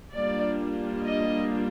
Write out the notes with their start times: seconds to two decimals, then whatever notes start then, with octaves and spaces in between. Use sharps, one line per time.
0.13 G3 A#3 D4 F4 D5
1.04 D#5